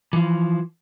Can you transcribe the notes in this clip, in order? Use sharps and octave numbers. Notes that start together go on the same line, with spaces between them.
E3 F3